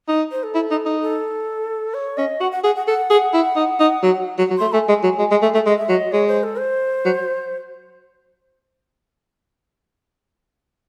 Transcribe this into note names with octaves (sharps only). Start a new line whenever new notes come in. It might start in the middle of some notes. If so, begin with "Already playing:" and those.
D#4
C5
A4
E4
D#4
D#4
A4
C#5
C#4 D#5
F#4 F#5
F#5
G#4 F#5
F#5
A4 F#5
G#4
E4
D#4
D#4
F#3
F#3
F#3
A3 C6
A3 G#5
G#3
F#3
G#3
G#3
A3
A3
G#3 D#5
E5
F#3 D#5
G#3 C#5
C5
A4
C5
F#3